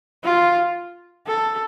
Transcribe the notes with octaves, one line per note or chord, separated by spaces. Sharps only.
F4
A4